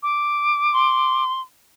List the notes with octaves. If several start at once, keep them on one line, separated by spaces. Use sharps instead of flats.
D6
C6